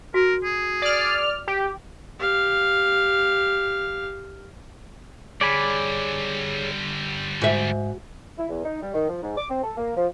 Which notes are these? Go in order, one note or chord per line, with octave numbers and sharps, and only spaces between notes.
F#4 A#4
G#4
D5 F6
G4
G4 F5
D3 G3 G#4 C#5 D5 G#5 B5
G#2 F#4 E5
E4
E2
D#4
G3
D#3
F3
G#2
D6
C4
A4
A#3
F3